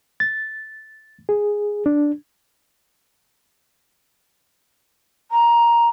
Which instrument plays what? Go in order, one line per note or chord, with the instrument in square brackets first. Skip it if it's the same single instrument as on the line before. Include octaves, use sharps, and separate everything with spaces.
[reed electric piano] A6
G#4
D4
[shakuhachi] A#5